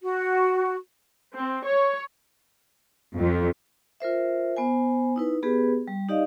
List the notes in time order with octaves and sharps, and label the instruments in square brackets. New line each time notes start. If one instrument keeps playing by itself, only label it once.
[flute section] F#4
[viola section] C4
C#5
[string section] F2
[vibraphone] F4 A#4 C5 E5
B3 C5 G#5
D#4 E4 B4
B3 G4 G#4 B4
G3
D#4 G4 D5 D#5 F5